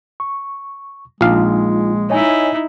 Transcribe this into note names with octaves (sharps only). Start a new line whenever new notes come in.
C#6
A#1 G#3 D#4 F4 F5
D#4 E4 C#5 D#5 G#5